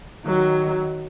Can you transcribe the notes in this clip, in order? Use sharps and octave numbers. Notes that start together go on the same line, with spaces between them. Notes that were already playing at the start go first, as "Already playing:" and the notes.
D#3 F#3